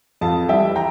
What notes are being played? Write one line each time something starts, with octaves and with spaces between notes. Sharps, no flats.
F2 F5 A5
E3 G3 E5 G5
G5 A#5